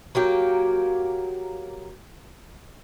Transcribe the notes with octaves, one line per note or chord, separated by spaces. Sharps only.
F#3 A#3 G4